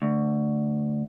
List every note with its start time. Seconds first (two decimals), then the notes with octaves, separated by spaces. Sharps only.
0.02 D2